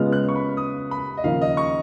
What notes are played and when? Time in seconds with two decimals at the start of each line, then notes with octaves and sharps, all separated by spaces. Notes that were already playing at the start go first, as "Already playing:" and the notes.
Already playing: C#3 G#3 B3 F4 F6
0.12 F#6
0.29 C#6
0.36 B5
0.57 D#6
0.91 B5
1.17 D#5
1.24 D#2 C#3 F3 A#3 F5
1.42 D#5
1.57 C#6